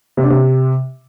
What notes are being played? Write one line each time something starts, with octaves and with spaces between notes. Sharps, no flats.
C3
D4
C3